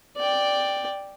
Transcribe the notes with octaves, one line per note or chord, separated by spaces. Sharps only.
D5 G5